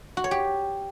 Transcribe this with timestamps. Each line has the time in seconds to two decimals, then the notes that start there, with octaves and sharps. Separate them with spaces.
0.17 F#4
0.24 C#5
0.31 G4